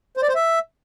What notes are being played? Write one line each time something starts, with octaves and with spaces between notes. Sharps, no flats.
C5
D5
C5
E5